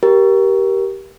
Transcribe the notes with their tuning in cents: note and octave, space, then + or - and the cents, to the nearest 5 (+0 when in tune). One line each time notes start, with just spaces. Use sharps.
G4 -10 A#4 +15